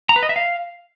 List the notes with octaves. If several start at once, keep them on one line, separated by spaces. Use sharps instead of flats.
A#5
B4
D#5
E5
F5